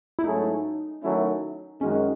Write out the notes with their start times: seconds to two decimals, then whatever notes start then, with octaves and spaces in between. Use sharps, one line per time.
0.19 E4
0.24 G#2 F#3 A3 C#4 D#4 G#4
1.02 D#3 F#3 A3 C#4 E4
1.81 F#2 D#3 G#3 C#4 D#4 F#4